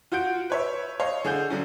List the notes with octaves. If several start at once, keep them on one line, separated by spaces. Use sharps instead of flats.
F4 F#4 F#5 G6 D7
B4 C#5 E5
C#5 D#5 F5
D3 G#4 F#5 G6
D3 F#3 C#4